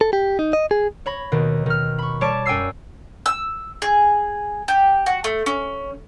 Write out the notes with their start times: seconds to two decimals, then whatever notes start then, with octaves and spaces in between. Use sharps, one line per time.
0.01 A4
0.13 G4
0.39 D#4
0.53 D#5
0.71 G#4
1.06 C#5 B5 A#6
1.32 D#2 B2 D#3
1.66 D#3 F6
1.98 B5 C#6
2.21 G3 C#5 A5 D6 D7 E7
2.46 F#2 G5 G#5 E6 C7
3.26 E6
3.82 G#4
4.68 G4
5.06 F#4
5.24 A3
5.46 C#4